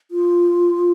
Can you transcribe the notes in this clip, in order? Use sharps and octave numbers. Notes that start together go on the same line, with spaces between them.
F4